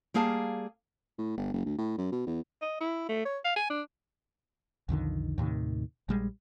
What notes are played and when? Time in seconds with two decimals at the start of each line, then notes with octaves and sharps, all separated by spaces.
0.14 G3 A#3 G#4 F5 A5
1.18 A2
1.37 G1
1.54 F#1
1.66 D2
1.79 A2
1.98 F#2
2.12 B2
2.27 E2
2.62 D#5
2.80 E4
3.09 A3
3.25 C#5
3.45 F5
3.56 G#5
3.70 D4
4.89 B1 F2 D3 D#3
5.38 D#2 A2 C3 D#3
6.09 A#1 G3 G#3